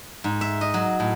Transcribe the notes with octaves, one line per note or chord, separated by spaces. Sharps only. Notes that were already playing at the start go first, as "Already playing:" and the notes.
G#2
E5
D#5
F#3
A2